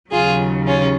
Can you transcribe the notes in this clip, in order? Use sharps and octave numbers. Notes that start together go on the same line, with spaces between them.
D#2 C#3 F#3 F4 G#4
C#4 F4